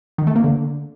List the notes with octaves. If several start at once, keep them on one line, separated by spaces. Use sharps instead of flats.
D#3
A3
A#3
D3